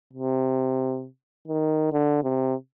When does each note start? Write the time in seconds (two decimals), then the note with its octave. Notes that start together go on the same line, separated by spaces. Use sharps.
0.13 C3
1.48 D#3
1.92 D3
2.23 C3